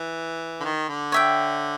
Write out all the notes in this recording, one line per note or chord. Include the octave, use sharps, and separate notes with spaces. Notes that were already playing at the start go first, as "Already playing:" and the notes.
Already playing: E3
D3
D#3
D3
C#5 E5 G5